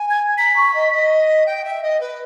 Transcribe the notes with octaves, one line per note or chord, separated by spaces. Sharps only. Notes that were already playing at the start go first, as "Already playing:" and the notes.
Already playing: G#5
G#6
A#5 B6
C#6
D#5
D#5
G5
E5
D#5
B4